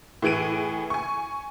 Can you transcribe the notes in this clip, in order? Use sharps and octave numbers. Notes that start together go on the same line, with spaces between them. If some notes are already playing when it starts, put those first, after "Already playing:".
A2 E3 G#4 D7 D#7
G#5 C#6